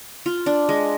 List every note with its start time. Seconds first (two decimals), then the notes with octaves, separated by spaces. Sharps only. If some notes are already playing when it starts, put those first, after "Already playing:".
0.26 F4
0.46 D4
0.69 G#3